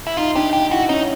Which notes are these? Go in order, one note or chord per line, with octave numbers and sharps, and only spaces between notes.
E4
D#4 F4
D4 G4
D#4 G4
E4 F#4
C#4 D#4